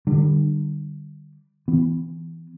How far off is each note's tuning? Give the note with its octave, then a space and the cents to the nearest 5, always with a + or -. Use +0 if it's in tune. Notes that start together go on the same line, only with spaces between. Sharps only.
D3 +40 G3 +0
E3 +0 B3 +25